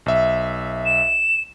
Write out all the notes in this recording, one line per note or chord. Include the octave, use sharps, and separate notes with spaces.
B1 E5
E7